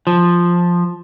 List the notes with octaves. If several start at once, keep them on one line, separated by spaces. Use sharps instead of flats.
F3